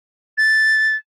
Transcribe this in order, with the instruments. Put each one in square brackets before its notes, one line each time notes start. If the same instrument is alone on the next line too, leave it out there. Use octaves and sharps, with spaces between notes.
[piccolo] A6